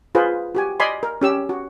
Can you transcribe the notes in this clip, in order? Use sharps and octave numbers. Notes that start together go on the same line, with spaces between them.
F4 G#4 B4 C5
F#4 G4 G#5
D5 D#5 G#5 B5 C6
A#4
C#4 G4 E6
F#4